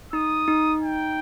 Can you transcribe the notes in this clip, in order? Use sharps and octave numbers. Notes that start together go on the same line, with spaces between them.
D#4 D#6
D#4
G5